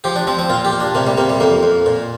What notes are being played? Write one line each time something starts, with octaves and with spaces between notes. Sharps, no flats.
F3 G4
D4
F3 C4
C4
A#2 F4
G4
A#2
D4
C3 A#3
G3
C3 A#3
G3
F2 A#3
F2
A#2